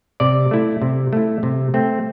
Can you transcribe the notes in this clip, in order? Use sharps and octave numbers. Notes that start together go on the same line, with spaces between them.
C3 D5
A3 E4
C3
A3 E4
C3
A3 C4